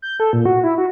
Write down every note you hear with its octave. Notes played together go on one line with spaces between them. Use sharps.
G6
A4
A#2
F#4
E4
F#4